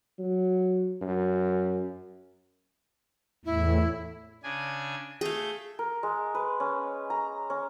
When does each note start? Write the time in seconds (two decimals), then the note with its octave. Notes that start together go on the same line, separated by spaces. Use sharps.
0.19 F#3
1.01 F#2
3.45 E2 A2 E4
4.43 C#3 D4 G#5
5.21 A3 G#4 F5 G6
5.79 A#4
6.03 G#3
6.35 B4
6.60 C#4
7.10 A#5
7.50 C#4